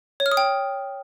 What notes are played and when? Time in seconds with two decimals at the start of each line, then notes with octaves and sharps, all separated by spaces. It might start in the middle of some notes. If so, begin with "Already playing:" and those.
0.20 C#5
0.26 F6
0.31 D#6
0.37 G5